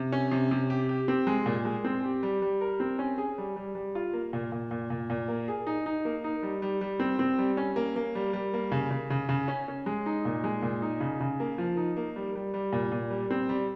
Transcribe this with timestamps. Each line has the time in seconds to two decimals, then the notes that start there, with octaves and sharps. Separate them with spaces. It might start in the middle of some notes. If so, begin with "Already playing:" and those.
Already playing: C3
0.12 C#4
0.31 C3
0.51 C3
0.70 G4
0.89 G4
1.08 C4
1.27 G#3
1.46 A#2
1.65 G#3
1.84 C4
2.04 G4
2.23 G3
2.42 G3
2.61 A#4
2.80 C4
2.99 C#4
3.18 G#4
3.38 G3
3.56 G3
3.75 G3
3.95 F4
4.13 A#3
4.33 A#2
4.52 A#2
4.71 A#2
4.90 A#2
5.10 A#2
5.28 A#3
5.48 G#4
5.67 D#4
5.86 D#4
6.05 A#3
6.24 D#4
6.43 G3
6.62 G3
6.81 G3
7.00 C4
7.19 C4
7.39 G3
7.57 C#4
7.76 A#3
7.96 A#3
8.15 G3
8.33 G3
8.54 A#3
8.72 C#3
8.91 C#3
9.10 C#3
9.29 C#3
9.48 C#4
9.68 C#4
9.86 G#3
10.06 D#4
10.25 A#2
10.44 G#3
10.62 A#2
10.82 D#4
11.01 C#3
11.20 C#3
11.40 A#3
11.58 F3
11.77 D#4
11.96 A#3
12.16 G3
12.35 G3
12.54 G3
12.73 A#2
12.92 A#2
13.11 G3
13.31 C4
13.49 G3